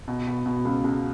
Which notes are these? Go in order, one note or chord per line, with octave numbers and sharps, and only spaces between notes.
B2
B2
B2
C#2
C#2